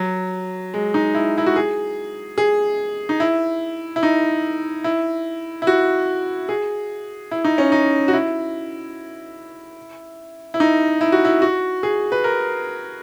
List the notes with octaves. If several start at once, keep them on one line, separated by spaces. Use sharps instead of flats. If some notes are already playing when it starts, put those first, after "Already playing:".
Already playing: F#3
G#3
D#4
E4
E4
F#4
G#4
G#4
D#4
E4
E4
D#4
E4
E4
F#4
G#4
E4
D#4
C#4
D#4
F#4
E4
E4
D#4
E4
F#4
E4
F#4
G#4
B4
A#4